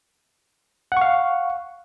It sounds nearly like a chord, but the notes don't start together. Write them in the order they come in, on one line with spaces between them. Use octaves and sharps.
F#5 C#6 F5